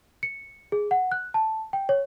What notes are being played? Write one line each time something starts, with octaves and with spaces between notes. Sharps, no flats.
C#7
G#4
F#5
F#6
A5
G5
C#5